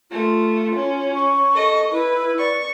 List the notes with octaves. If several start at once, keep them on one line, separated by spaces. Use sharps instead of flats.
A3 F4
C#4
C#6
A4 D#5
E4 B4
D5 C#6